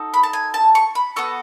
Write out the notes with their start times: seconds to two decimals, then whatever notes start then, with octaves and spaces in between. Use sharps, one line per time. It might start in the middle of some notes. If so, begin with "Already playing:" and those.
Already playing: D#4 F#4 A4
0.14 B5
0.23 A5
0.33 G#5
0.54 A5
0.75 C#6
0.95 B5
1.16 B3 F#4 A4 C#6